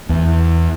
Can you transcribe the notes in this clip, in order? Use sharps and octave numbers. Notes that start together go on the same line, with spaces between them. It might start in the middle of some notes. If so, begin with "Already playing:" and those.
E2